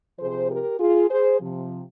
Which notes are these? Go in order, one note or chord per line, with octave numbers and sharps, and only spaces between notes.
C3 F3 G#4 C5
G4 A#4
F4 G#4
G#4 C5
C3 F3